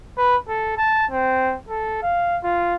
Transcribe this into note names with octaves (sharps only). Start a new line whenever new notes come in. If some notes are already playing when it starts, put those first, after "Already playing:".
B4
A4
A5
C4
A4
F5
F4